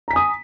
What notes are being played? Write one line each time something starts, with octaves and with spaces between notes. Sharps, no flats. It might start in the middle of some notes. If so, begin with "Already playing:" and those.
G#5 A#5 D#6 B6